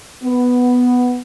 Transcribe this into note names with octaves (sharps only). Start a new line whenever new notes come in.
B3